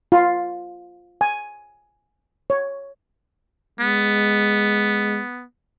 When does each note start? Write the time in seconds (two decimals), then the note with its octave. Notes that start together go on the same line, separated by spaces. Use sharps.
0.12 F4
1.21 G#5
2.50 C#5
3.80 G#3 B3